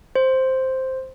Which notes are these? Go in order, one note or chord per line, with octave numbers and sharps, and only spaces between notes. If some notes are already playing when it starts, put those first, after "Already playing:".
C5